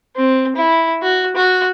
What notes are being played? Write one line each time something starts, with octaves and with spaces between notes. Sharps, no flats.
C4
E4
F#4
F#4